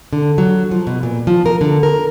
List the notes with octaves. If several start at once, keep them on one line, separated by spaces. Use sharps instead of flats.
D3
F#3
F3
B2
A#2
F3
A#4
D3
A#4